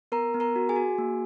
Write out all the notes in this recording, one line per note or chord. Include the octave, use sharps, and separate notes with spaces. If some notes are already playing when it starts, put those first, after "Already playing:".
B3 A#4 A#5
B3
A#4 A#5
F#4
G#4 G#5
F#4
A#3